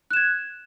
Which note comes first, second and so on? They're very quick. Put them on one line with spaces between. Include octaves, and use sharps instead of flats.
F#6 E7 G#6